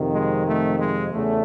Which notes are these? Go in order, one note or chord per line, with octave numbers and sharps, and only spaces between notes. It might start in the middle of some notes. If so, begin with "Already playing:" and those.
Already playing: F2 C3 D#3
G#3
A3
G#3
E2 C#3 A3